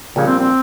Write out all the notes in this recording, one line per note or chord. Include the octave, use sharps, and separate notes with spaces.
A#1 A#2 C#3 G3
C4
C4